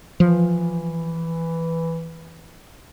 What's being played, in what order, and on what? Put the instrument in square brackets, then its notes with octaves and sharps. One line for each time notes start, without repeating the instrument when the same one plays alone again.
[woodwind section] E3 [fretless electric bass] F3